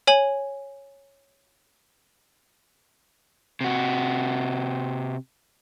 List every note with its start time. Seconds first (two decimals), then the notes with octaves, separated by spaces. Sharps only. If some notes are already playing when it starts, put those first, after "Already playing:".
0.07 C#5 G#5 F#7
3.61 C3 F#4